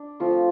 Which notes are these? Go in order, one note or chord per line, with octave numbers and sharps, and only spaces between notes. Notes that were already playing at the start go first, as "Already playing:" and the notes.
Already playing: D4
F3 A3 C4 F4